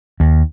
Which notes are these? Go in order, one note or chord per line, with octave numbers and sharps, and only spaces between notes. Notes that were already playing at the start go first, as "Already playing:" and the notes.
D#2